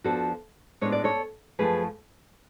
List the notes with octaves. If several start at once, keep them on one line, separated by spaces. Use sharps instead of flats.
F2 F3 B3 D4 F#4 A4
A2 G#3 B3 D4 C#5
D5
A4 C#5
F#2 C#3 F3 A3 G#4 B4